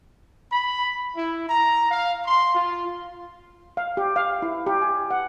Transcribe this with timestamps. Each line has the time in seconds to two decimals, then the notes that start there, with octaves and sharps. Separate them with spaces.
0.52 B5
1.14 E4
1.48 A#5
1.90 F5
2.25 C6
2.54 F4
3.77 F5
3.97 G4
4.16 F5
4.42 E4
4.67 G4
4.82 G#5
5.11 F#5